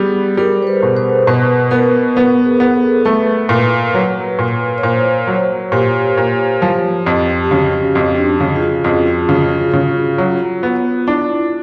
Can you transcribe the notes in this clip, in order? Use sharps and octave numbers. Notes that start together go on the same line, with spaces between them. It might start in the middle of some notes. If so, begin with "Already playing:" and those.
Already playing: G3 B3 G#4
G3 A#4
C5
B4
B2
C5
B2 B4
B3 A#4
B3 A#4
G#4
B3
A4
A3 B4
A#2
F#3
A#2
C#5
A#2 C5
F#3
A#2 G4
A#2
F3
F2
G4
C#3 F#4
C#4
F2
D4
C#3 G#4
F4
F#4
F2 F4
F4
C#3
C#3
F#3
B3
D4 E4